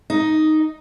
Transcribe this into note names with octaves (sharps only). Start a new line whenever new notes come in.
D#4